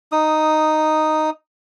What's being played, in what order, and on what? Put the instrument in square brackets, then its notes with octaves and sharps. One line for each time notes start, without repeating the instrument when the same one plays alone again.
[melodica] D#4 D#6